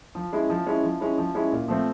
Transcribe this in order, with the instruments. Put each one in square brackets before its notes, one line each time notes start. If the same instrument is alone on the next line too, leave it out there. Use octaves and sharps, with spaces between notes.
[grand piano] F3
G#3 C#4 E4
F3
G#3 C#4 E4
F3
G#3 C#4 E4
F3
G#3 C#4 E4
A#2
F3 A3 C4